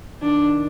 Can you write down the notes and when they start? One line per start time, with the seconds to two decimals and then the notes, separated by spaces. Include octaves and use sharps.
0.22 D#3 D4